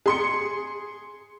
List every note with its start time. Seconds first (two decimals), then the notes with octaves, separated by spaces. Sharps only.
0.06 G#4 C6 C#7